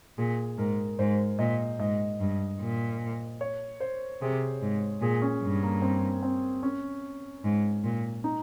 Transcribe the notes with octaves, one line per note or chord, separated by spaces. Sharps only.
A#2 G#4
G#2 A#4
G#2 C5
A#2 D#5
G#2 D#5
G2
A#2
C#5
C5
C3 G#4
G#2
A#2 G#4
C#4
G2
A#3
C4
C4
C#4
G#2
A#2
D#4